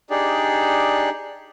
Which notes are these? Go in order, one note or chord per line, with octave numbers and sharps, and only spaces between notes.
D4 D#4 G4 G#4 D5